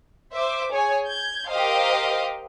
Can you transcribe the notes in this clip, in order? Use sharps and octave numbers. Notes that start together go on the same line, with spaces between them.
C5 E5 D6
G#4 C#5 G#5
G6 G#6
G4 A#4 C5 D#5 F5